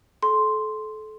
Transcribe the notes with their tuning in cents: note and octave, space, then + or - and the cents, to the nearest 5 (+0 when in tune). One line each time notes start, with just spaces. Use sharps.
A4 -30 C6 +0